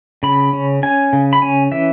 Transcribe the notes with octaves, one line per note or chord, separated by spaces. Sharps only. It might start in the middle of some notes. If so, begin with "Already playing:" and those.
C#3 B5
C#4
C#4 G#5
C#3
B5
C#4 G#5
E3 E5